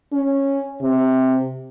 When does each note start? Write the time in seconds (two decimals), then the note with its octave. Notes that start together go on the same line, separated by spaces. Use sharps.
0.13 C#4
0.82 C3